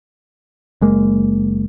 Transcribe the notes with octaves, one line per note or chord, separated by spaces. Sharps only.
F#1 G#3 A#3